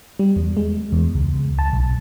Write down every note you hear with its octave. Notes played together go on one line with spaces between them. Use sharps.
G3
E2
G#3
E2
C#2
C#2
A5
B1